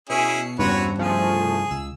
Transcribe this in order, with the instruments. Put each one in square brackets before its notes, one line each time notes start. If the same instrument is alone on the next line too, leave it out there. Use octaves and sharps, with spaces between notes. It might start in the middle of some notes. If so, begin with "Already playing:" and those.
[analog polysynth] B2 C7 C#7 [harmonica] C#4 E4 G#4
[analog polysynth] E2 C4 A#5 [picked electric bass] G2 C#3 [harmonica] F#4 B4 C#5
[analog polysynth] C2 F3 A3 [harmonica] G#4
[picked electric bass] C#2 [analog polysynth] E6